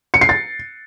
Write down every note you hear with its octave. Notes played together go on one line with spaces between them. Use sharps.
C#7
C7
A6